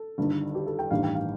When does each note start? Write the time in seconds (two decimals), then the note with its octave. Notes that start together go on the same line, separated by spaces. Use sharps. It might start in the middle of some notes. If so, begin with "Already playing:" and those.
Already playing: A4
0.18 G1 G2 D#3 G3
0.55 G4
0.66 A4
0.79 G5
0.91 A1 G2 D#3 G3 F5
1.03 G5
1.15 F5